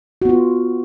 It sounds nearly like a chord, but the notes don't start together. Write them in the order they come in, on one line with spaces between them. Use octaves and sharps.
F#4 B3 F4